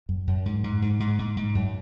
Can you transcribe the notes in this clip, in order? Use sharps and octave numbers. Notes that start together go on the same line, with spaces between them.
F#2
F#2
G#2
G#2
G#2
G#2
G#2
G#2
F#2